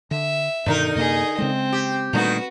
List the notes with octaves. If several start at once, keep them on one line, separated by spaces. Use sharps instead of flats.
D3 E5
G2 B2 D3 D#3 D#4 A#4
F#2 C3 A#3 G#4 D#5
C#3 G#3 C4
G4
A#2 D3 D#3 G3 A3 D#4 F#4 B4